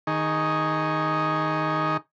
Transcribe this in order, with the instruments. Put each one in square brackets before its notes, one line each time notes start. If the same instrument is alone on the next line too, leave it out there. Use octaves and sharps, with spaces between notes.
[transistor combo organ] D#3 D#4 G#4 C#6